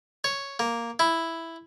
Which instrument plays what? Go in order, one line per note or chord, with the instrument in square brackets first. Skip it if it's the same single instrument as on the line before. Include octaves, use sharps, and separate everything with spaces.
[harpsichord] C#5
A#3
E4